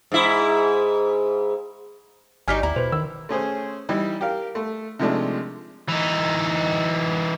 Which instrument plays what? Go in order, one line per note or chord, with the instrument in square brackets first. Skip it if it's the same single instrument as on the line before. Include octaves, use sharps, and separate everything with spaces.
[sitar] G#2 E4
[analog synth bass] G#1 [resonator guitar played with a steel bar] F#3 G3 D#4 [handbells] G#5 F6 B6
[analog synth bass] D#2 [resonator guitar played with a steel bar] E4 [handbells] A#5
[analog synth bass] B2 [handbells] B4 C5
[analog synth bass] D#3 [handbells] E6
[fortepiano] A3 C#4 G#4 C5
E3 G3 D#4
G4 A#4 F5
A3
C3 D#3 F3 G#3 A3 D4
[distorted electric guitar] E3 D#4